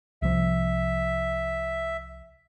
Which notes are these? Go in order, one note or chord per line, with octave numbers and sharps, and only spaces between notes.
C2 F3 E5